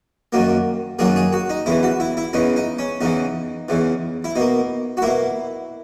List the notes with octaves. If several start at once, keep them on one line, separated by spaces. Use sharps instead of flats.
F#2 D#3 F#3 A#3
F#2 D#3 F#3 A#3 G#4
G#4
F#4
D#4
E2 C#3 E3 E4
F#4
E4
E4
E2 C#3 E3 D#4
D#4
C#4
E2 C#3 E3 D#4
E2 C#3 E3
E4
B2 A#3 D#4
F#4
B2 A#3 E4